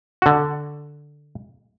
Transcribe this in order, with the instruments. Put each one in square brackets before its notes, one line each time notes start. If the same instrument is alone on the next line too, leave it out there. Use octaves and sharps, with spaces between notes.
[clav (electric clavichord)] D3 F#4